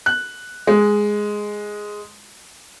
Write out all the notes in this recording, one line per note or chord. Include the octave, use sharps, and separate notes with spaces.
F#6
G#3